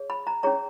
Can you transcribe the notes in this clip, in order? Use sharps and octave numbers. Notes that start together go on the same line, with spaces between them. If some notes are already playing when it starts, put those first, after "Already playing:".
Already playing: G#4 C#5
B5
A#5
C#4 G#4 C#5 A#5